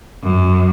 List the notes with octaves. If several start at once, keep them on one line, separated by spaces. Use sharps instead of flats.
F#2